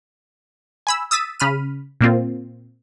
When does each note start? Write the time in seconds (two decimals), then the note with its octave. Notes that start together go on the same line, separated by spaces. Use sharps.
0.87 G#5 B5 E6
1.11 D#6 E6 A6 B6 D#7
1.40 C#3 B5 F6 D#7
2.01 A#2 A#3 C4 F4